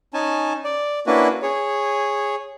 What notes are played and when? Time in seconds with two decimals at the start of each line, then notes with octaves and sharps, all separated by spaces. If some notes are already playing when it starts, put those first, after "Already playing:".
0.14 C#4 D#4 G#5 A5
0.64 D5
1.07 A#3 C#4 D4 E4 F#4 B4
1.42 G#4 C#5